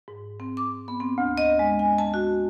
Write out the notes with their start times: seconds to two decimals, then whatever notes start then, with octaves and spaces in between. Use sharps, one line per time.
0.08 G#2
0.40 C4
0.57 D6
0.88 B3
1.00 C4
1.18 D2
1.38 D#5
1.59 G#3
1.79 G#5
1.98 A5
2.14 F#4